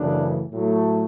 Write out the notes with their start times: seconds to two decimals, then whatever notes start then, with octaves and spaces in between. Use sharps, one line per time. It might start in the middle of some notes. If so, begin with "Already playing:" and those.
Already playing: F#2 C#3 E3 A3 D4
0.52 A2 F#3 A3